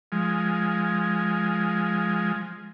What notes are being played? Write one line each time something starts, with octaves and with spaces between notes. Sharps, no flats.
F3 G#3